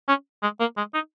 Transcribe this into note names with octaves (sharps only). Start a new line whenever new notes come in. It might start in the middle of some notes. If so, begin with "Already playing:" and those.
C#4
G#3
A#3
G#3
D#4